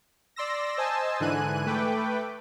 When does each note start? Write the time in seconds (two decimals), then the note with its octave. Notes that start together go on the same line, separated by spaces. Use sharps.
0.36 D5 C6 E6 A#6
0.78 C5 D#5 G#5 A5 E6
1.20 G#2 D3 E3 G#5 F#6 D#7
1.66 A3 B4 G5 D6